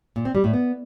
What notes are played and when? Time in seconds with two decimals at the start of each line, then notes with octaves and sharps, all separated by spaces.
0.16 A#2
0.25 C4
0.35 G3
0.44 A2
0.53 B3